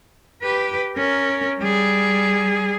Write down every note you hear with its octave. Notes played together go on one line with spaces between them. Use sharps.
G4 B4
C#4 A#4
G3 G#4